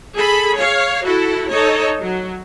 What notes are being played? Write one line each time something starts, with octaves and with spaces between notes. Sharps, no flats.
G#4 A4 B5
C#5 F5
E4 F#4 A4
D#4 A4 C#5
F#3